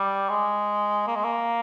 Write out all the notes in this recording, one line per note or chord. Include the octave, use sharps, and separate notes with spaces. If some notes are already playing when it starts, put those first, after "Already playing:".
Already playing: G3
G#3
A#3
G#3
A#3